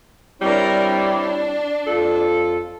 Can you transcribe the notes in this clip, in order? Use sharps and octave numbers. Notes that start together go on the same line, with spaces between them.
G3 C4 D4 E4 A#4 C#5
D4
F2 F4 A4